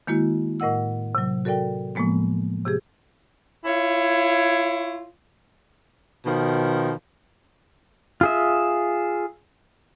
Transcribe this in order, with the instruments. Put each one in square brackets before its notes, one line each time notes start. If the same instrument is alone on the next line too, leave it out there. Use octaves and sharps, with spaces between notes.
[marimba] D#3 G#3 A#3 E4 F#4
A2 A#4 D#5 F#5 E6
C3 F#3
F#4 A4 A#4 D5 G5
A2 F3 G#3 A#3 B3
C3 G4 G#4
[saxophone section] E4 F4 C#5
B2 D#3 F3
[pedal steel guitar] F4 G#4 E5